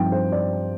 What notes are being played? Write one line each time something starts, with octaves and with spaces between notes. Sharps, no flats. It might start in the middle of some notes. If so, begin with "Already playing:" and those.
Already playing: G2 F3 C4 D#4 G5
C5
D5